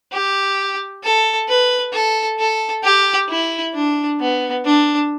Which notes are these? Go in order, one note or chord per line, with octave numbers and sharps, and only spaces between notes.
G4
A4
B4
A4
A4
G4
E4
D4
B3
D4